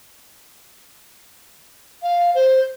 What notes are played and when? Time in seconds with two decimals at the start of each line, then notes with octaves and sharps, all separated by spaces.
2.03 F5
2.35 C5